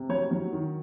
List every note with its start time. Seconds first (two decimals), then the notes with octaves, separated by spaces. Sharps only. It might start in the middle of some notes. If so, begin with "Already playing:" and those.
Already playing: C3
0.09 F#3 C#5
0.31 F#3
0.53 D#3